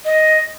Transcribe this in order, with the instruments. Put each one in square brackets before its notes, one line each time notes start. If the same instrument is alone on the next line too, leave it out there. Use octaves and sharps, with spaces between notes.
[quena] D#5